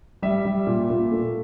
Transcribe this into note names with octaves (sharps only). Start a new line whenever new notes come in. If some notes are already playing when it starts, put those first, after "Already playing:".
G3 E5
G3
A#2
A#2
A3